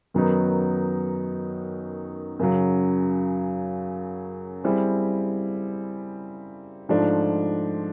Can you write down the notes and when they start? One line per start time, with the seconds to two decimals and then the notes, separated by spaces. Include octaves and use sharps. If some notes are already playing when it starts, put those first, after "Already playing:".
0.14 F#2 D#3 F#3 B3 D#4
2.39 F#2 C#3 F#3
4.64 G3 C4 E4 G#4
6.89 G#2 F3 A3 D4